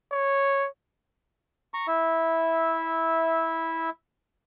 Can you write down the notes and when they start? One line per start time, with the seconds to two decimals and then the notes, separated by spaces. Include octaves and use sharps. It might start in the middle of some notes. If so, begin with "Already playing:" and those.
0.12 C#5
1.74 A#5 C#6
1.88 E4 E5